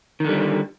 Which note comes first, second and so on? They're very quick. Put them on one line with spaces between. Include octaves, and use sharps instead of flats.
D#3 D3 G3